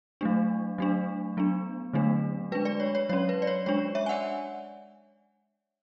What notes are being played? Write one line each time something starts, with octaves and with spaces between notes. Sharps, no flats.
F#3 A3 D4
F#3 A3 D4
F#3 B3 D4
D3 F#3 A3 D4
G#3 D4 B4
B4 D5
C#5
C#5
F#3 C#4 C#5
B4
D5
C#5
G#3 D4 C#5
C#5 E5
G#5
D5 F#5